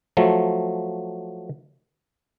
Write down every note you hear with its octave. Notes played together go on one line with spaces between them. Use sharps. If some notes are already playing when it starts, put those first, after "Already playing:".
F3 F#3 A3